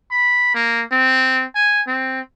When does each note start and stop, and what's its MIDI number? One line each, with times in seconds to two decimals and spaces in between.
0.11 0.51 83
0.55 0.83 58
0.92 1.44 60
1.55 1.82 80
1.87 2.20 60